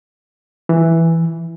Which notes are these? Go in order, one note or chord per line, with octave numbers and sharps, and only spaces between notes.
E3